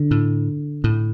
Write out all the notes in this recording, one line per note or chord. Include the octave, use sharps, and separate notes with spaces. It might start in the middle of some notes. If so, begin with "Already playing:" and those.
Already playing: D3
A2
A2